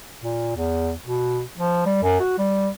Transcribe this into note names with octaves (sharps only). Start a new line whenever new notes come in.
A#2
E2
B2
F3
G3
F#2
F#4
G3